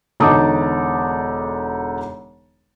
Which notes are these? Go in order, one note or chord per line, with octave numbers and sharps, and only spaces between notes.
E1 D3 D#4 A5 D6 D#6